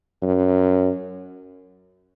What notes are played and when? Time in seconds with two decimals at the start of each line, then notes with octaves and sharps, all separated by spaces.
0.22 F#2